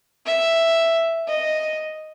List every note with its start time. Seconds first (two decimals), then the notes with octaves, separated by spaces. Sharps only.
0.26 E5
1.27 D#5